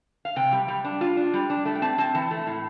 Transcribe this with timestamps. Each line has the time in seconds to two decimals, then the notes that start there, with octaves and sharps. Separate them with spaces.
0.25 F5
0.36 C3 G5
0.53 G3
0.68 G3
0.85 D4
1.01 F4
1.17 D4
1.34 G3
1.50 D4
1.65 A3 A5
1.75 G5
1.82 C4 A5
1.98 C4 A5
2.15 E3 A5
2.31 A3
2.47 A2